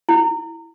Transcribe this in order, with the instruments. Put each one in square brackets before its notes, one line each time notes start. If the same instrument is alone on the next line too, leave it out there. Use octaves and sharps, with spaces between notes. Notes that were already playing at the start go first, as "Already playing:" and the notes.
[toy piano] E4